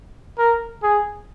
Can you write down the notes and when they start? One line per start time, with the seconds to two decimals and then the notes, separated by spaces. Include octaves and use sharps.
0.39 A#4
0.83 G#4